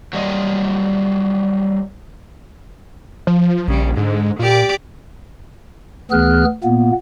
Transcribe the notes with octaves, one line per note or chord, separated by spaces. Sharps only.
F#3 G3 D#5
F3
A#1 C#3 G3
G#2 D3 G#3
A#2 G4 D5
D2 E3 B3 G#4 F6 F#6
A#2 A#3 B3